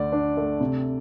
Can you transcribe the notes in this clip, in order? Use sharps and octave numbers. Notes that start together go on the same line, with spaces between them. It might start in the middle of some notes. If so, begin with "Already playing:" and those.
Already playing: D2 D3 D5
D4
A3
C3